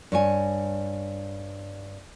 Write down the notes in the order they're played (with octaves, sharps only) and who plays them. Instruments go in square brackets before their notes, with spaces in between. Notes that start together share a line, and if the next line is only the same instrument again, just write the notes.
[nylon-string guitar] G2 C#5 G#5